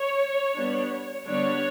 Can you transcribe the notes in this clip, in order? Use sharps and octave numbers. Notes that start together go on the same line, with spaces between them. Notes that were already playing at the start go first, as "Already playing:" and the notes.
Already playing: C#5
G3 B3 D4
D3 G3 B3 D4 C#5